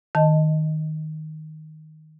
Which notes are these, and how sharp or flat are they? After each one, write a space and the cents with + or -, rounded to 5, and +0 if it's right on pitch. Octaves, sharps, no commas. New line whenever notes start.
D#3 +0 D#5 +0 A5 +5